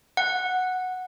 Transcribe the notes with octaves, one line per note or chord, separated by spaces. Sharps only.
F#5